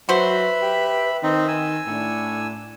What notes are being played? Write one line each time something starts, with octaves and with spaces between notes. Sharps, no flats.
F#3 F#4 B4 C5 E5 B5
G4
D#3 C4 D#4
G#5 E6
A2 D4